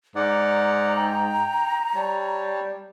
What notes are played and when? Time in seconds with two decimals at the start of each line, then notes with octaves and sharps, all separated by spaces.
0.15 G#2 D5 F#5 A#5
0.97 G5
1.95 G3 C#5 A5